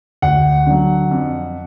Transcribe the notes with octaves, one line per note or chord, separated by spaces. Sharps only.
D2 F#5
D3 F#3
F2